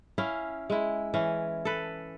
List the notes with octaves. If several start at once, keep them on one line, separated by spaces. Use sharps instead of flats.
C#4 E4 F5
G#3 E4
E3 C#4
A4 B4